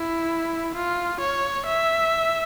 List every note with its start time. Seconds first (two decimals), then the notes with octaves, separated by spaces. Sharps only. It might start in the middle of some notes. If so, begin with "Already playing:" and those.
Already playing: E4
0.75 F4
1.21 C#5
1.66 E5